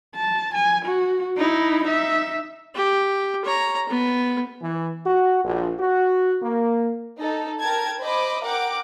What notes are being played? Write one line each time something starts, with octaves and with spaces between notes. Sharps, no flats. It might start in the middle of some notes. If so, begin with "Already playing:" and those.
A5
G#5
F#4
D#4 E4
D#4 E5
G4
C#5 A#5
B3
E3
F#4
A#1
F#4
A#3
D#4 A4
A#4 G5 A5 G#6
C5 D#5 B5 D6
A#4 F#5 G5 D6